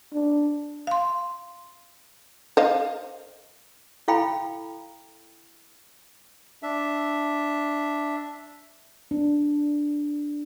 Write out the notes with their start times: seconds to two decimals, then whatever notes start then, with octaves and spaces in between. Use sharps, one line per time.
0.13 D4
0.87 F5 C6
2.57 C5 D#5 F5
4.08 E4 A4 F5 G5 B5
6.63 D4 E5
9.11 D4